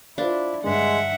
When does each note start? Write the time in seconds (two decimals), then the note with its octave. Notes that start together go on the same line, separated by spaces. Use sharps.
0.18 D4 E4 F4 C5 F5
0.64 G2 D3 G#3 E5 F#5